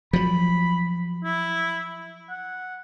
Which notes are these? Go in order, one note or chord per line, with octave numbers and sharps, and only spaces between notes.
F3 F#3 B5
E4
F#5